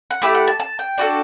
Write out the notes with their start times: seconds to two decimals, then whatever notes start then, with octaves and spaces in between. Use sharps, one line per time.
0.11 F#5
0.22 A3 E4 G4 E5
0.35 F#5
0.48 A5
0.60 A5
0.79 G5
0.98 D4 F#4 A4